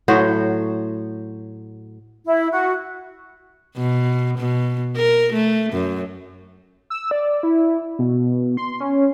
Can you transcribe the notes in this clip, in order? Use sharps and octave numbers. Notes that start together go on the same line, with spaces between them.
A2 F#3 F#4 C5
E4
F#4
B2
B2
A#4
A3
F#2
E6
D5
E4
B2
C6
C#4